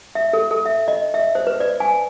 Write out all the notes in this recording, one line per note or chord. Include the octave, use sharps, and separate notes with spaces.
E5
A4
A4
E5
D#5
E5
C5
B4
D5
G#5